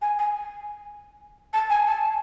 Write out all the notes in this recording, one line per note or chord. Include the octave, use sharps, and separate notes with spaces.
G#5
G#5
A5
G#5
A5